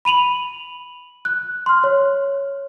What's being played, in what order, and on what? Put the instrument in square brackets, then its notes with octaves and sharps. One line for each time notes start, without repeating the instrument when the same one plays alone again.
[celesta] B5 D#7 F7 F#7
F#6
C6 F6
C#5